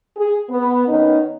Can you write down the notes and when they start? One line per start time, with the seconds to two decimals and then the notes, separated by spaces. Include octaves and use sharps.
0.17 G#4
0.50 B3
0.88 D#3 B3 C#4 D#4